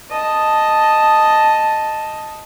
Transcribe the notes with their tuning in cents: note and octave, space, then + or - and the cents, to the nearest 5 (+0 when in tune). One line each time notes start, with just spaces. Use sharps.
D#5 +0 A5 +0